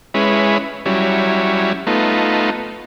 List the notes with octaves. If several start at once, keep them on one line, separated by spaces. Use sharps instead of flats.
G#3 C#4 E4 B4
F#3 G3 C#4 E4
A3 B3 D#4 F4